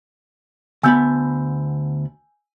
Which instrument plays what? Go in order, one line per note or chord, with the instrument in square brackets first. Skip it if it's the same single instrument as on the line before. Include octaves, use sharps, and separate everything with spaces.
[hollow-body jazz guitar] D2 B3 B5 [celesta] G#5 E6 G6